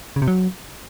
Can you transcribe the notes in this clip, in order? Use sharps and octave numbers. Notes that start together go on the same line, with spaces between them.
C#3
C3
F#3